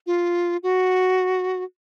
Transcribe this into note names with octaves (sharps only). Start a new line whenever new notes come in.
F4
F#4